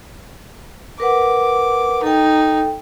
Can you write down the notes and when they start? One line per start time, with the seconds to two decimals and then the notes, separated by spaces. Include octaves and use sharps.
1.00 A#4 B4 F#5 D6
2.03 D#4 A4 G5